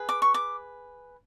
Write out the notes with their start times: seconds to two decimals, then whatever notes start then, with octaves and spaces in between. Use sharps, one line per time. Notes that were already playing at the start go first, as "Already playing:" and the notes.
Already playing: G#4 B4
0.09 D6
0.22 C#6
0.34 D6